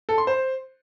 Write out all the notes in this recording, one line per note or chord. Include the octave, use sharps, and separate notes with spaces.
A4
C6
C5